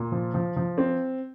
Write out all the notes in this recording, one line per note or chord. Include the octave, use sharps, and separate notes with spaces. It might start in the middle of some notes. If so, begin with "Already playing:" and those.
Already playing: A#2
F3
F3
F3
C4